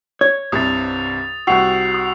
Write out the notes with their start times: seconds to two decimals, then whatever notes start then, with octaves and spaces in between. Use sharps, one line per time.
0.21 C#5
0.52 C2 G2 C3 D#6 A6
1.47 C2 F#4 G5 E6 C7 F7
1.94 D#6